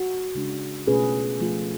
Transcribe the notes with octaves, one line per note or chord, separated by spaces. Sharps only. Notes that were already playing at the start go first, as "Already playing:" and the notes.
Already playing: F#4
C#3 G#3 D4
B2 A3 C#4 F4 G#4 B4
F3 A3 F4